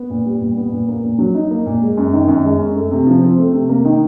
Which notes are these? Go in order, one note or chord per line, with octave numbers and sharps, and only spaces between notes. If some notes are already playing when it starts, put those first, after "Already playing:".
Already playing: B3
A#2
G3
A#2
B3
A#2
A#3
A#2
F#3
D#4
A#3
A#2
G#3
F#2
D#3
F#2
G#3
F#2
A3
C3
F3
C4
A3
C3
A#3
D#3